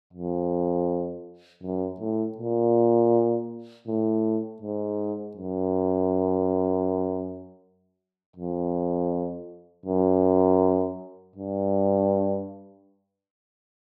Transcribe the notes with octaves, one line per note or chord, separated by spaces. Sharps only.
F2
F#2
A2
A#2
A2
G#2
F#2
F2
F#2
G2